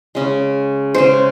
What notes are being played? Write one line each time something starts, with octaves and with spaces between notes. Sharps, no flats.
C#3 G#3
C#3 G#3 C5